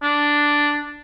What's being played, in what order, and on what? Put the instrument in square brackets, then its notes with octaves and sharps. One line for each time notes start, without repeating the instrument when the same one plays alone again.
[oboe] D4